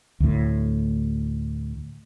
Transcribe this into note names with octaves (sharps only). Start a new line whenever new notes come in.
D2 A2